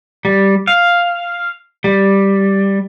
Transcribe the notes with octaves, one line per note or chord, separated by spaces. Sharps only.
G3
F5
G3